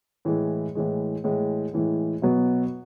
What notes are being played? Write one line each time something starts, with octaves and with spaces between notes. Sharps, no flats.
A2 E3 G#3
A2 E3 G#3
A2 E3 G#3
A2 E3 G#3
B2 F#3 B3